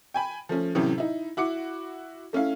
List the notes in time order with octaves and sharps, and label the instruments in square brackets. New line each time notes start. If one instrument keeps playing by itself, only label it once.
[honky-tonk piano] G5 G#5 B5
F3 A3 C#4
A2 C3 E3 F#3 C#4
D#4 E4
E4 F#4 D6 C#7
A3 C#4 E4 F5